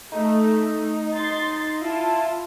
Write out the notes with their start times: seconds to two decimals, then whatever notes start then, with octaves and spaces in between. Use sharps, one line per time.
0.12 A3 D#4
1.14 D#4 C6 A6
1.82 E4 F4 A5